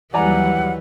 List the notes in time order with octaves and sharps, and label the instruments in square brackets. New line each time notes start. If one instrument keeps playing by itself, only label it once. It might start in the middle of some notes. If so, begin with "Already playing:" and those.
[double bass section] D#2 F#3 G3 [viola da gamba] E3 [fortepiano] D5 G#5 A#5 [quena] F#5